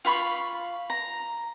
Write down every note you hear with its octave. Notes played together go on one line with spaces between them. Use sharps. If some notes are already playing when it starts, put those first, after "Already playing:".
F4 F5 B5 C#6
A#5